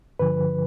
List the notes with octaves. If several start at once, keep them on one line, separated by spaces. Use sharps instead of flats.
G2 D3 F3 B4